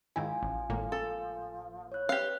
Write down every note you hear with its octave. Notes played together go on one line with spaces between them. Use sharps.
G#2 D#3 F3 E4 G#5
A1
G#1 A2 A#3
A4
E4 C#5 F#6
G4 B4 F5 F#6